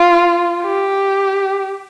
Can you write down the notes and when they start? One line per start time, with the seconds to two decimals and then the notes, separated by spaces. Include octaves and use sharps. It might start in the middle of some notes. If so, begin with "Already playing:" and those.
Already playing: F4
0.63 G4